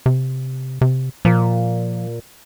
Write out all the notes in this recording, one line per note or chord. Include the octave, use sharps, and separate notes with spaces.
C3
C3
A#2 F3